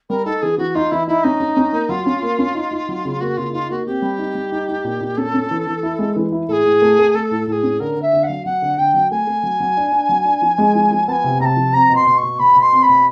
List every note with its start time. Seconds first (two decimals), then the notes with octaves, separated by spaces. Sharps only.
0.09 G3 A#4
0.25 D#4 A4
0.42 E3 G#4
0.58 E3 F#4
0.75 D#4 F4
0.91 E3 E4
1.07 D#4 E4
1.24 C#4 D#4
1.40 C#4
1.57 C#4
1.73 A#3
1.89 F#3 F4
2.06 C#4
2.22 A#3
2.39 C#4
2.55 D#4
2.71 D#4
2.89 F#3
3.05 C#3
3.21 A#3 F#4
3.37 C#3 F4
3.53 D#4 F4
3.70 A#3 F#4
3.86 C4 G4
4.02 G3
4.19 D#4
4.35 G3
4.52 D#4
4.69 D#4
4.84 A#2
5.01 A#2
5.17 C#4 A4
5.34 C#4
5.51 E3
5.67 E3
5.83 E4
5.99 G#3
6.16 E3
6.32 E4
6.48 A2 A4
6.52 G#4
6.65 A2
6.82 A3
6.98 A3
7.14 A3 A4
7.31 A2
7.47 A2 A4
7.52 G#4
7.63 C#4
7.80 D3 A#4
7.97 D3
8.02 E5
8.13 D3
8.23 F#5
8.27 F#3 F5
8.45 F#3 F#5
8.62 D3
8.78 D3 G5
8.94 F#3
9.11 A3 G#5
9.27 A3
9.43 F#3
9.60 F#3
9.77 D4
9.92 D4
10.09 F#3
10.25 D4
10.42 F3
10.58 G#3
10.75 F3
10.91 F3
11.08 B3 A5
11.12 G#5
11.24 C3
11.40 C3 A#5
11.45 A5
11.56 F3
11.73 C4 A#5
11.89 B2
11.95 C6
12.07 B2
12.18 C#6
12.23 B2
12.39 B2 B5
12.56 B2
12.61 C6
12.72 C4
12.83 B5
12.89 B2